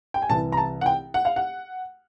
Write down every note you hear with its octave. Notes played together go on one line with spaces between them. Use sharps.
G5
G#5
C2 C3 E3 A5
A#5
A5
F#5
G5
F#5
F5
F#5